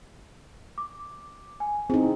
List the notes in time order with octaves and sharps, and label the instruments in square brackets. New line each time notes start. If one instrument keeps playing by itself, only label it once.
[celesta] D6
G#5
[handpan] C4 D#4 [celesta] E4 G#4